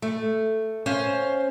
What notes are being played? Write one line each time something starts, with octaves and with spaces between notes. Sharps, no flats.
A3
C#4 C5 F5